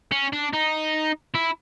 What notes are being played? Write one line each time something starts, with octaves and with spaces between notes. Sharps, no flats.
C#4
D4
D#4
E4